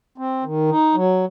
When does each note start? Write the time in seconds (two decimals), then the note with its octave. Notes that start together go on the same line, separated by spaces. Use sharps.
0.18 C4
0.44 D#3
0.69 D#4
0.95 F#3